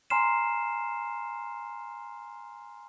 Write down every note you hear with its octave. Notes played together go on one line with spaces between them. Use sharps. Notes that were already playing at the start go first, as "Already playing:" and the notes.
G#5 A#5 C6 F6 C7 E7